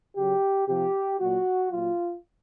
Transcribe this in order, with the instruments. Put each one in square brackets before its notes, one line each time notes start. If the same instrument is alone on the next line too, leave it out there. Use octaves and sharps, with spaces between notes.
[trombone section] C#3 F#3 G4
C3 F3 G4
A#2 F#3 F#4
A#2 F#3 F4